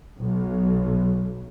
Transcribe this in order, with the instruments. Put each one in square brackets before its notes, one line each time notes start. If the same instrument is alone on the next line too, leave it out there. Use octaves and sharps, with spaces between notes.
[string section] B1